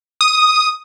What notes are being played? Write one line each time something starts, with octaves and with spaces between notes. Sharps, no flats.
D#6